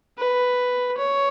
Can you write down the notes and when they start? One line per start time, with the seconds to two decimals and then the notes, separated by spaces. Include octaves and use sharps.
0.17 B4
0.98 C#5